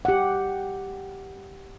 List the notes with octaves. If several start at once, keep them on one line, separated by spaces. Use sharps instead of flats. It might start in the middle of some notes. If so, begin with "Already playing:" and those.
G4 F#5